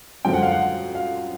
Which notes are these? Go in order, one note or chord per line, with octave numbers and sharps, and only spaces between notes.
F#2 D3 F3 G#3 C4 G5
F#5
F5
F#5
F5